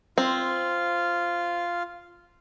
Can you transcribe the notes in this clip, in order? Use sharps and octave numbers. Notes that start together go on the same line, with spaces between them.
C4 F4 F5